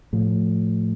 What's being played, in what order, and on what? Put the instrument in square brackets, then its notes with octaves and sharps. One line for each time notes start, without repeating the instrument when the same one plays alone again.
[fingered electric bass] A2 F3